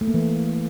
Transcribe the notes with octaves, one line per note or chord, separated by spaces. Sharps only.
A3
A#3
E3